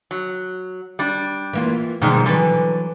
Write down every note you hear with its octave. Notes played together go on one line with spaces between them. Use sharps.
F#3
G3 D4
E3 A#3 F4
G#2 B2 D#3 F3 G3 G#3
D3 E3 F#3 B4